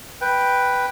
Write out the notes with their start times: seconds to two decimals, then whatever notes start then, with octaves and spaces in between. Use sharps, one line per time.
0.21 B4 G5